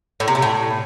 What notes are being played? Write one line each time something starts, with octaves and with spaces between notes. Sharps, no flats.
A2
C3
A3
A2